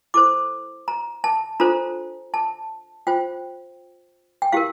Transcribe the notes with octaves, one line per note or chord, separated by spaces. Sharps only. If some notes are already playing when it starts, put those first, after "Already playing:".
E4 A4 C5 D6
A#5
A5
D4 F4 A4 C5 A#5
A5
F4 C5 G5
G5
E4 G4 A#4 F5